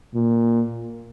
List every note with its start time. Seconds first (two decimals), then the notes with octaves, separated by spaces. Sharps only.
0.14 A#2